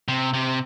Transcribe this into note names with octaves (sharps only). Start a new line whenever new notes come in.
C3
C3